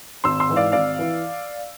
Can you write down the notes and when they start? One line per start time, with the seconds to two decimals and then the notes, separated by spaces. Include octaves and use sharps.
0.24 G#1 C6 E6
0.40 C6 E6
0.49 G#2 E3
0.56 D5 F5
0.72 G#1 D5 F5
0.99 E3